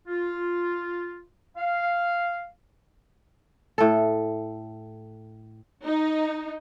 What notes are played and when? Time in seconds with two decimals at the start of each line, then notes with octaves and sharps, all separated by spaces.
0.08 F4
1.57 F5
3.78 A2 A4
5.84 D#4